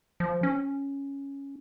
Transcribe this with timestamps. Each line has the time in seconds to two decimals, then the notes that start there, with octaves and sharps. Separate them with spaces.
0.20 F3
0.43 C#4